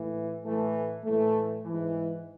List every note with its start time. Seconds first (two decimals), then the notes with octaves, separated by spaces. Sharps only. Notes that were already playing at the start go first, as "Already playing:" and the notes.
Already playing: A2 E3
0.44 A2 E3 A3
1.04 A2 E3 A3
1.65 G#2 E3